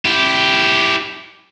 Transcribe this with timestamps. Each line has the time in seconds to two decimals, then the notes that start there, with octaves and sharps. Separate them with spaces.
0.05 E4 G4